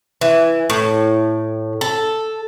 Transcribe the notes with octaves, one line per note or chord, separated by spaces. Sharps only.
E3
A2
A4